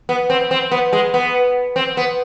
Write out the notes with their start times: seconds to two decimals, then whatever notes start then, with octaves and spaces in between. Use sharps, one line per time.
0.09 B3
0.30 C4
0.51 C4
0.72 B3
0.93 G#3
1.14 B3
1.76 C4
1.97 B3